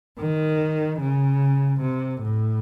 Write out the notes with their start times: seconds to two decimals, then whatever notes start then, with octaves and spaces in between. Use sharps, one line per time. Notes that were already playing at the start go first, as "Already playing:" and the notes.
0.20 D#3
1.00 C#3
1.81 C3
2.22 A2